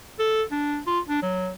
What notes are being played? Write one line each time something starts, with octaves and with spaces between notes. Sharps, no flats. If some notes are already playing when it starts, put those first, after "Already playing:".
A4
D4
F4
D4
F#3